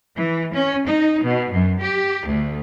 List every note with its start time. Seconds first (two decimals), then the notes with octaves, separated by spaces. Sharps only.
0.16 E3
0.52 C#4
0.86 D#4
1.23 B2
1.52 F#2
1.81 G4
2.29 D2